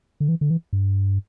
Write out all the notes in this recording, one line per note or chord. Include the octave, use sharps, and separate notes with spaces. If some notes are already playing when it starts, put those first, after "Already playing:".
D3
E3
D3
E3
G2